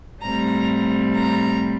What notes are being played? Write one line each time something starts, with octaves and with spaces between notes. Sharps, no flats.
A2 G3 C4 A#5
A#5